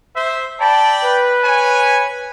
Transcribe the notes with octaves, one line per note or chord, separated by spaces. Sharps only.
C5 E5
D5 G5 A5 B5
B4
C#5 G#5